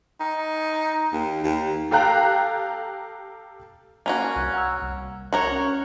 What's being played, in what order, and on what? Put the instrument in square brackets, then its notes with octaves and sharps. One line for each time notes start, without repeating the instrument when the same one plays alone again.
[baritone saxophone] D#4
D#2
D#2
[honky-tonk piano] G4 A4 F5 G5 A#5 F#6
[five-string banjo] A#3 C#4 F#4 [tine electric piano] G#5
[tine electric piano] C2 G#6
F#5 A#5 E6
C2
[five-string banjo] F#4 A#4 C#5
[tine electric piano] C#4